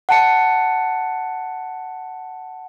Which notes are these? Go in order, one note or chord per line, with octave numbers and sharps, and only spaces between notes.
F#5 A5 C#7